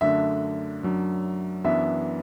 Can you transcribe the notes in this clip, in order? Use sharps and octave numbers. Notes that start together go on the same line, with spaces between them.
F#2 D3 A3 D4 E5
F#2 F#3 D4
F#2 E3 B3 D4 E5